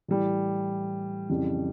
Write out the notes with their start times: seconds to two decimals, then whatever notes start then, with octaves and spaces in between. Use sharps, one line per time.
0.08 A2 E3 G3
1.29 F2 C#3 E3 G3